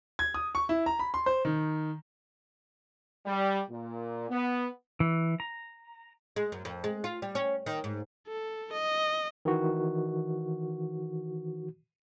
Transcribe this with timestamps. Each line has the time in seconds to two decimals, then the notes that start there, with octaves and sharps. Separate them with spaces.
0.19 G#6
0.34 D#6
0.55 C#6
0.69 E4
0.86 A#5
0.99 B5
1.14 C6
1.26 C5
1.45 D#3
3.26 G3
3.70 A#2
4.29 B3
5.00 E3
5.40 A#5
6.36 G#3
6.52 F#2
6.65 F2
6.84 G#3
7.04 F4
7.22 G3
7.35 C#4
7.66 D#3
7.84 G#2
8.27 A4
8.72 D#5
9.45 D#3 E3 F#4